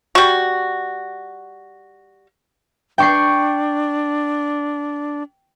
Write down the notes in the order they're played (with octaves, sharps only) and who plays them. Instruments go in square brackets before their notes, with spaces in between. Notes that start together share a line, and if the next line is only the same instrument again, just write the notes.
[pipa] G3 F#4
[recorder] D4 [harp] G5 C#6 C7